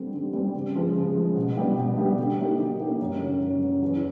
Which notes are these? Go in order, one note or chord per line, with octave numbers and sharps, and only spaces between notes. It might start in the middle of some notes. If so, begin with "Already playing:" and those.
Already playing: D3 G3 C4
D3
G3 C4
C#3
F3 G#3
C#3
F3 G#3
B2
G3 B3 D4 G4
B2
G3 B3 D4 G4
D3
F#3 A#3 D#4 G4
D3
F#3 A#3 D#4 G4
F#2
C#3 F#3
F#2
C#3 F#3
E2